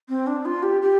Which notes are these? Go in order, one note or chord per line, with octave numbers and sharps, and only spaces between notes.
C4
D4
F4
G4
G4